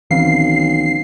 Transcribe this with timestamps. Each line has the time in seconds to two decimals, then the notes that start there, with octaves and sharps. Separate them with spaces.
0.11 B1 D#3 E3 C4 C#4 F5 C7